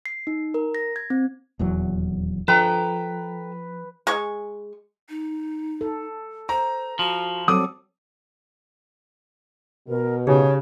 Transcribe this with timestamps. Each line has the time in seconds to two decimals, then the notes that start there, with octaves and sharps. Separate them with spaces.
0.06 C7
0.27 D#4
0.54 A#4
0.75 A#6
0.96 G#6
1.10 C4
1.59 D#1 E2 F#3
2.48 F3 A4 B4 G5 A#5
4.07 G#3 C#6
5.09 D#4
5.81 A4
6.49 C5 A#5
6.99 F3 F#4
7.48 F#3 G3 C4 A4 D6 D#6
9.87 B2 A#4
10.27 C#3 D#4 G4 G#4 C#5